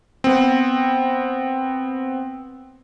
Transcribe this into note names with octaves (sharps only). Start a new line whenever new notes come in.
B3 C4